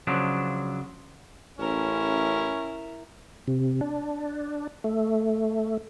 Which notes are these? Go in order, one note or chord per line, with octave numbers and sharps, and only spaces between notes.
C#3 F3 F#3 D4
A1 C#4 E4 A#4
C3
D4
A3